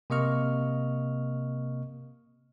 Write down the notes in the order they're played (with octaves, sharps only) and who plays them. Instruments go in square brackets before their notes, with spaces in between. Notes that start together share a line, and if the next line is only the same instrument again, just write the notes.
[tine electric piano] C3 A#3 D#5 C#6 F6